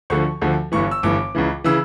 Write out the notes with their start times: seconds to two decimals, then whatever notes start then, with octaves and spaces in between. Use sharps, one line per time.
0.10 D2 D3 F3 C#6
0.42 D2 D3 F3
0.72 G1 G2 E3 C#6
0.91 E6
1.03 G1 G2 E3 D6
1.35 C#2 C#3 E3
1.64 C#3 E3 E6